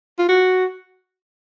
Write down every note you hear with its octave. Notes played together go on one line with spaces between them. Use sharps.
F4
F#4